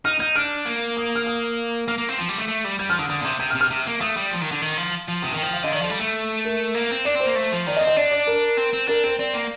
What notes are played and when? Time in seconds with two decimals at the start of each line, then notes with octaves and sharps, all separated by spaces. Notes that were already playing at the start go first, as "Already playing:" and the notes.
0.05 D#4 F6
0.20 D#4 G6
0.36 D4 F6
0.65 A#3
0.97 D#6
1.15 F6
1.26 D#6
1.88 A#3 F6
1.98 A#3
2.09 C4
2.18 F3
2.29 G3
2.38 A3
2.48 A3
2.64 G3
2.79 G3 G6
2.90 F3 F6
2.99 D3 D#6
3.09 D3 D#6
3.21 A#2
3.24 C3 G6
3.40 C3 G6
3.50 F6
3.55 C3
3.61 F6
3.70 C3
3.86 A#3
4.01 A3 D#6
4.17 G3
4.31 F3
4.41 D#3
4.52 D3
4.62 D#3
4.77 F3
5.08 F3
5.22 C3 D#6
5.32 D#3
5.38 F3 G5
5.53 F5
5.64 D3 D#5
5.72 D#3 D5
5.82 F3 A4
5.90 G3
5.99 A3 A4
6.45 A#4
6.75 A#3
6.91 C4
7.05 D4 D5
7.15 C4
7.20 C5
7.26 A#3
7.35 A3
7.52 F3
7.67 D#3 D5
7.77 D#5
7.81 C4
7.87 D#5
7.97 D4 D5
8.12 D5
8.27 A#4
8.57 C4
8.73 C4
8.88 D4 A#4
9.04 C4 A#4
9.19 C4 D5
9.34 A#3